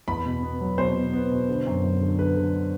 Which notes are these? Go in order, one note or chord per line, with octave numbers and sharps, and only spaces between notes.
E2 B5
B2
B3
F#3
B2 C5
B2
B3
B2
D3
F#2
F#2
D3
D3 B4
D3